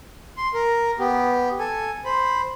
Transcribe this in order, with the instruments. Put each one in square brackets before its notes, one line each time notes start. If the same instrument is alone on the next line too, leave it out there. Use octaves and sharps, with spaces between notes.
[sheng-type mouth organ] C6
A#4
B3 G4
A4 G#5
C5 B5